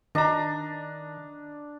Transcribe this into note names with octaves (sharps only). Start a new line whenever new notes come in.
D#3 D4 D#5 A#5